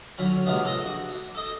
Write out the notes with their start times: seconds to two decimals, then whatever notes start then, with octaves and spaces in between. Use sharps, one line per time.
0.18 D3 F#3 C#4 B5
0.45 G#2 C3 F3 G#3 A#3 B3
0.63 D4 A4 D#5
0.85 F#4
1.09 D4
1.35 A4 D#5